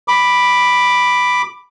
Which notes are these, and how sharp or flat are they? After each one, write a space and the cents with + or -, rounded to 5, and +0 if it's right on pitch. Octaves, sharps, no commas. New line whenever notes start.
B5 +0 D6 +10